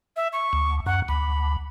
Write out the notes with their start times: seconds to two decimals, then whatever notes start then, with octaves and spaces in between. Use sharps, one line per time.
0.17 E5
0.33 C#6
0.53 D2
0.86 F#2 F#5
1.08 D2 B5